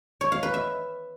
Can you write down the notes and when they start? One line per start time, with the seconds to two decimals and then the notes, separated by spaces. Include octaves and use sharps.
0.21 C#5
0.32 F5
0.43 B4
0.54 E5